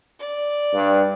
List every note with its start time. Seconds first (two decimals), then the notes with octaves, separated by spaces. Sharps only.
0.20 D5
0.74 G2